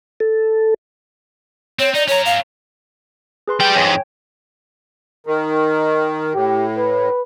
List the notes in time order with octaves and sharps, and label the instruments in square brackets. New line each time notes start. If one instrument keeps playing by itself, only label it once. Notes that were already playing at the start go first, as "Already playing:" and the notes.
[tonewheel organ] A4
[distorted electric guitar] C4 [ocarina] C#5
[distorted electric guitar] D#4 [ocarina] D5
[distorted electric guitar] C#4 A#5 [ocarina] C#5
[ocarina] F5
[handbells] G#4 B4 C6
[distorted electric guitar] G3 G5
[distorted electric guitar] F2 G#2 [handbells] C#5 G5 G#5
[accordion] D#3
[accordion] A2 [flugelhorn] G4
[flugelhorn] B4